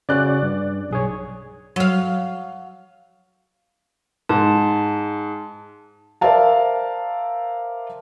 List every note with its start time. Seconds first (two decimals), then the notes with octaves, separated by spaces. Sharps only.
0.09 C#3 C#4 F#4 D5 F#6
0.43 G2
0.90 B1 G#4 C#5
1.76 F#3 F5
4.29 G#2 A5
6.21 A#4 C5 D5 E5 F5 A5